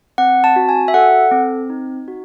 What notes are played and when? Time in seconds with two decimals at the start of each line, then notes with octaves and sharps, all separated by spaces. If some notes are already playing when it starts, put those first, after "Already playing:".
0.18 C4 F#5
0.44 A5
0.56 F#4
0.69 G#5
0.88 E5
0.94 A4 F#5
1.32 C4
1.70 D#4
2.08 F#4